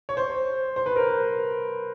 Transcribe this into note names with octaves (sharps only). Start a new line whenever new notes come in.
C#5
C5
C5
B4
A#4